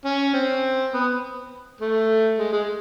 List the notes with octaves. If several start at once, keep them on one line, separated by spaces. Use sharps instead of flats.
C#4
C4
B3
A3
G#3
G#3